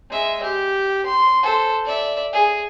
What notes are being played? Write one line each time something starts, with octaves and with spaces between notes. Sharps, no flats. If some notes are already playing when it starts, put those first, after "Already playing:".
G#3 E5
G4
C6
A4 C5
D5 E5
G#4